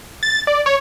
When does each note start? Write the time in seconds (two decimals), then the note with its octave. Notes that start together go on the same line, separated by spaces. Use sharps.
0.23 A6
0.47 D5
0.66 C#5